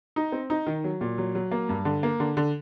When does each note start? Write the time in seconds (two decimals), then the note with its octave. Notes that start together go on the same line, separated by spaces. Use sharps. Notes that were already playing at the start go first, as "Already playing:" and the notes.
0.16 D#4
0.32 C4
0.50 D#4
0.67 D#3
0.84 F#3
1.01 A#2
1.18 F#3
1.35 F#3
1.51 A#3
1.69 G2
1.85 D3
2.03 A#3
2.20 D3
2.37 D3